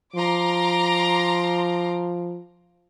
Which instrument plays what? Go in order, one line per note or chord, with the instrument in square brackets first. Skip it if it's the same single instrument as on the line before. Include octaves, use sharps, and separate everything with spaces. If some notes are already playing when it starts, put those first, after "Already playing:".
[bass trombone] F3 [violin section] A#5 C6 D6